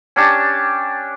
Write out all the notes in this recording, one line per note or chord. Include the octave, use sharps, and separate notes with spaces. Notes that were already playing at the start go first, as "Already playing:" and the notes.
C#4 D4 G4 A5